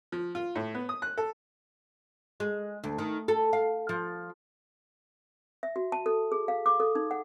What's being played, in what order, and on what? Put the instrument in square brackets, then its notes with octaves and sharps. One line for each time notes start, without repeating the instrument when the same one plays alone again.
[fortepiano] F3
F4
A2
B3
D#6
F#6
A4
[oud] G#3
D2
D#3
A4
F5
F3
[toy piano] E5
F#4
A5
A4
G#4
F5
D6
A4
D#4
F#5